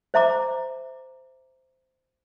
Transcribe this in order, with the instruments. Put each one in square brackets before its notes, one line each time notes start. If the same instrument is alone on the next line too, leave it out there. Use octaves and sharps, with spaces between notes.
[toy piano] C5 E5 A#5 D6